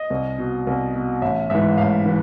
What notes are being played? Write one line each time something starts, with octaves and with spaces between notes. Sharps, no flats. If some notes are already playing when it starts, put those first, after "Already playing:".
Already playing: D#5
C2
B2
C2
B2
A1 E5
G#2 E3 E5
A1 F5
E3